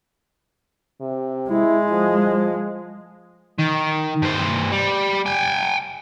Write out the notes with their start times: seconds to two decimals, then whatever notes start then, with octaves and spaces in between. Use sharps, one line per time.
1.01 C3
1.50 G#3 E4
1.91 F3
3.58 D#3
4.22 G2 C5
4.72 G3
5.26 G5 G#5